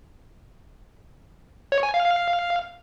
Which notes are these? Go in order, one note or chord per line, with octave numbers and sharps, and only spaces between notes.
C#5
G#5
F5
F5